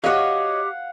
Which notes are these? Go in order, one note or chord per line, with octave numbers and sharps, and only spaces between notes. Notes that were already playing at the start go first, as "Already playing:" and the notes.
F#4 G4 C#5 D#5 F5 F#5